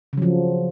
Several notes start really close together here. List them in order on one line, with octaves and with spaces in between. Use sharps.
C#3 F#3 F3